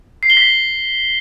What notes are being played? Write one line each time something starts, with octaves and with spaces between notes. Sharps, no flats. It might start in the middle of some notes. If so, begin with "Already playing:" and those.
C7
G7
B6